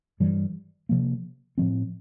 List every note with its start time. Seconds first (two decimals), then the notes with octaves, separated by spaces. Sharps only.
0.20 G2 E3 G3
0.89 C3 F3 A#3
1.58 A2 F3 C4